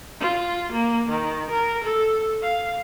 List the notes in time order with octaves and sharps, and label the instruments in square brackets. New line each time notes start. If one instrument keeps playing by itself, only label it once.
[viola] F4
A#3
D#3
A#4
A4
F5